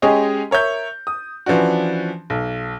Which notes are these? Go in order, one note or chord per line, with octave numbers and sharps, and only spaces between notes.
G#3 C#4 G4 G#4 C#5 D#5
A#4 C#5 E5 G6
D#6
E3 F3 C#4 D4 F#4
B1